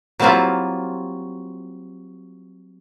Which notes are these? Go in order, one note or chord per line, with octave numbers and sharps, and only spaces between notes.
F#3 G3 A#3 C4 E4 F4